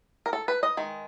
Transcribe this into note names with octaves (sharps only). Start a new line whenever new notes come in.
A#4
A4
B4
D#5
D#3 G#3